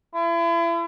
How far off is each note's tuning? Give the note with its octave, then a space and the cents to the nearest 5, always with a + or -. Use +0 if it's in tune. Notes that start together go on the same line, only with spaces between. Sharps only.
E4 +40